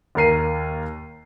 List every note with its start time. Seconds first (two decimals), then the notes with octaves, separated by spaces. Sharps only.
0.15 D#2 A#3 A#4 C7 D#7